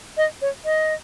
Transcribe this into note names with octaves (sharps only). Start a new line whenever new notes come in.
D#5
C#5
D#5